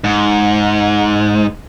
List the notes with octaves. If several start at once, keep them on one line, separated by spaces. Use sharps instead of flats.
G#2